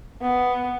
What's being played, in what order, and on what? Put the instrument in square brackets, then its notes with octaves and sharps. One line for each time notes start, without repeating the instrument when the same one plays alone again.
[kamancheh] B3